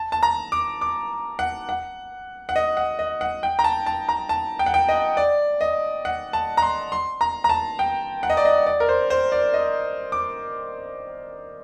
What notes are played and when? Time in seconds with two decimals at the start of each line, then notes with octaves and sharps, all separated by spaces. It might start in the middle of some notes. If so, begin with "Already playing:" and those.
Already playing: A5
0.12 A5
0.23 A#5
0.52 D6
0.81 D6
1.39 F#5
1.69 F#5
2.49 F#5
2.56 D#5
2.77 F#5
2.99 D#5
3.21 F#5
3.43 G5
3.59 A#5
3.64 A5
3.86 A5
4.09 A#5
4.29 A5
4.59 G5
4.66 F#5
4.74 G5
4.88 D#5
5.17 D5
5.61 D#5
6.05 F#5
6.33 A5
6.57 A#5
6.62 C6
6.92 C6
7.21 A#5
7.44 A#5
7.49 A5
7.79 G5
8.23 F#5
8.30 D#5
8.37 D5
8.45 D#5
8.66 D5
8.80 A#4
8.89 C5
9.10 C5
9.32 D5
9.54 D#5
10.12 D6